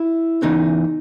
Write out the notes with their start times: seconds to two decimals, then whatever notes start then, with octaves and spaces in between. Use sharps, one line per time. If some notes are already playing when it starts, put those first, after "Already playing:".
Already playing: E4
0.42 E2 C#3 E3 D#4